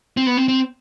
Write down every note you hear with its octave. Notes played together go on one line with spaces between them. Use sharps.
C4
B3
C4
C4